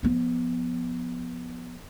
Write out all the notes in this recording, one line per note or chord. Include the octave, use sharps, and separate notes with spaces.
F3 B3